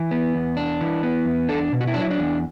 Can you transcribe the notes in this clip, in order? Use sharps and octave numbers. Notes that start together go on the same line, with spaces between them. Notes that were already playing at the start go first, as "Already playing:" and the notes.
Already playing: E3
B3
E2
D4
E3
B3
E2
D4 A4
B2
F#4
E4
F#3 D4
E4
D4
E2